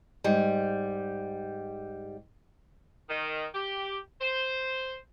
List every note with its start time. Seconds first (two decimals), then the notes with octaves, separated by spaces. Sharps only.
0.24 G#2 G3
3.09 D#3
3.54 G4
4.21 C5